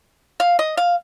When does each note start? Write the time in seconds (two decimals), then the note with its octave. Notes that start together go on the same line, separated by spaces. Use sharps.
0.40 F5
0.59 D#5
0.77 F5